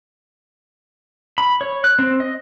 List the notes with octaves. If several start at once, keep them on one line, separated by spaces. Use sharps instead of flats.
B5
C#5
F#6
C4
D#5